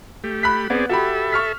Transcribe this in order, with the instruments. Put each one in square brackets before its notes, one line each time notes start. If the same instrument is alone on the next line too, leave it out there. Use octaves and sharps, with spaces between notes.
[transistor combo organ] A3 G4
[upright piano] B5 F#6 B6
[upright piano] B3 [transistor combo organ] C4 G#4 D5
[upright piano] F#4 G4 B5 [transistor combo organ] A4 E5
[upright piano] C#6 F6 B6